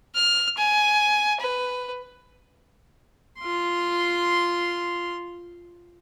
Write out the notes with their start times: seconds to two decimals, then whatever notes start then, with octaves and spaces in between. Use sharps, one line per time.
0.15 F6
0.57 G#5
1.40 B4
3.39 F4 C6